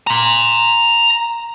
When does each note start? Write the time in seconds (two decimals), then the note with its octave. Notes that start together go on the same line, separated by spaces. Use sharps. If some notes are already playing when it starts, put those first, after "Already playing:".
0.07 A#5 C6